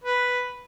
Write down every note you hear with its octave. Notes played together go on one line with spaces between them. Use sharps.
B4